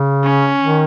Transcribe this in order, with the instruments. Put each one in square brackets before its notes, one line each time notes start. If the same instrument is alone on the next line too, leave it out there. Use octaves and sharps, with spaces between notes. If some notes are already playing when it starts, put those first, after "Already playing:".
Already playing: [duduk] C#3
[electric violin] C#4
[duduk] D#3